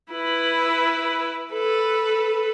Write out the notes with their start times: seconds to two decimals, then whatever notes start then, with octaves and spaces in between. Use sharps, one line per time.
0.12 E4 B4
1.53 A4 B4